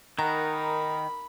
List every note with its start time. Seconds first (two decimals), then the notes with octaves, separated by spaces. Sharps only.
0.19 D#3 D#4 A#4 F#5 A#5 B5
0.51 B5